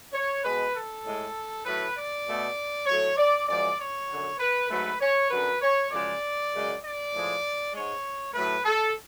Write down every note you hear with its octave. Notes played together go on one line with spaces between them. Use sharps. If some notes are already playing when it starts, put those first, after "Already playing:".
C#5
B2 G#3 B4
A4
A2 G#3
A2 F#3 A3 B4
D5
B2 A3
A2 F#3 A3 C#5
D5
F#2 F3 G#3 D5
C#5
F#2 D3 F#3
B4
G#2 F#3 A3 B4
C#5
F#2 D3 F#3 B4
C#5
F#2 C#3 F3 G#3 D5
F#2 C#3 G#3
D5
A2 F3 G#3
G#2 G#3 C#5
A2 F#3 A3 B4
A4